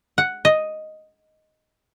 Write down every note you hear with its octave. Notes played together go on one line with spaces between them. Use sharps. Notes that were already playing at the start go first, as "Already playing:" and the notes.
F#5
D#5